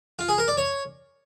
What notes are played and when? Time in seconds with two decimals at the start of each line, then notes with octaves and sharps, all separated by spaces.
0.19 F4
0.29 G#4
0.38 A#4
0.48 D5
0.57 C#5